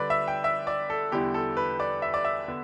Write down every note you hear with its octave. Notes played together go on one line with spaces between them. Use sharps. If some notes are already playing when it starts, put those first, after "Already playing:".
Already playing: D3 G3 D4 B4 D5
E5
G5
E5
D5
A4
E2 D3 G3 E4 G4
A4
B4
D5
E5
D5
E5
D3 B3